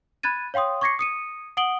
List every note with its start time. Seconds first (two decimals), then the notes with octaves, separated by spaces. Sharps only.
0.23 B5 F#6 G#6 A6 D#7
0.54 C#5 F5 G5 C6 D#6
0.81 C#6 D6 G#6 A#6 C7 C#7
0.99 D#6 C#7 D#7
1.57 F#5 D#6 D7 F#7 G7